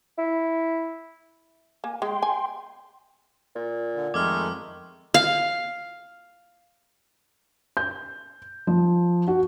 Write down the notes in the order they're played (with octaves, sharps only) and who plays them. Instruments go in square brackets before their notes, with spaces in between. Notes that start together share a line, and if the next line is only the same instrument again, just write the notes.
[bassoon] E4
[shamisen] A#3 [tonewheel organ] G#5
[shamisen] G#3 [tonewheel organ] G5 C6
[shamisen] G#5
[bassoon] A#2
[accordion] D3
[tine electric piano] F2 G#6 [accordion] D#3 G#3 A3 [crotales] D6 E6 F6
[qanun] F5
[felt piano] G6
F3
F#4